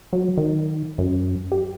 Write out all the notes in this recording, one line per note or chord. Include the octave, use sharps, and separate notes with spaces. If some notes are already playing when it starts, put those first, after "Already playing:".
F#3
D#3
F#2
G4